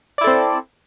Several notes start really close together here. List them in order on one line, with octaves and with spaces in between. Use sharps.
D5 E4 A4 C4